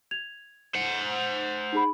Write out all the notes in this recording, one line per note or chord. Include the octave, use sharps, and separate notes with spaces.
G#6 F7
C5 F#5
D#4 G#4 B5